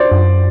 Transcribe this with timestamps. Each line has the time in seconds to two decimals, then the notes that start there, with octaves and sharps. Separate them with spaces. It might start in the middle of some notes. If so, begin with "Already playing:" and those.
Already playing: C5 D5
0.12 F#2